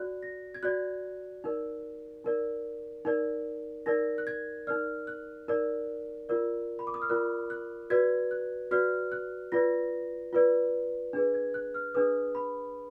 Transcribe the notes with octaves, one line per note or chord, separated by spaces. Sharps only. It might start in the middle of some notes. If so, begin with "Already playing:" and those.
Already playing: F#4 D5 F#6
A#6
G#6
F#4 D5 F#6
D#4 A#4 D5
D#4 A#4 D5
D#4 A#4 D5
D#4 A#4 D5 A#6
F#6
G#6
D#4 A#4 D5 F6
F#6
D#4 A#4 D5
F4 A#4 D5
B5
D6
D#6
F6
F4 A#4 D5 F#6
F#6
F#4 B4 D5 G#6
F#6
F#4 B4 D5 F6
F#6
F4 B4 D5 A#6
F4 B4 D5
D4 G#4 B4
G#6
F#6
F6
D4 G#4 B4 D#6
B5